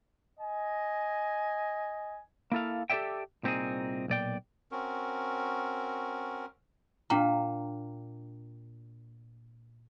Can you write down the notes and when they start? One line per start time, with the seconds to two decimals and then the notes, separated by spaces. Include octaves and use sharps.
0.40 D#5 G#5
2.52 A#3 E4 A4 F5
2.90 G4 A4 C#5 D5 E5 G5
3.43 C2 A#2 C4 C#4 D#4 G#4
4.08 B1 A#2 D5 G5
4.72 C4 C#4 F#4 A#4
7.10 A#2 D4 G5 A#5